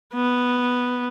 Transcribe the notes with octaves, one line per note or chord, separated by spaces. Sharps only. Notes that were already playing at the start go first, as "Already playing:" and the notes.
B3